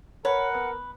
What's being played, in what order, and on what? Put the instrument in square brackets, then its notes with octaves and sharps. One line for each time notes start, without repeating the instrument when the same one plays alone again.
[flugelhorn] A#4 [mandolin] B4 [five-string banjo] C#5 [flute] F#5
[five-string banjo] B3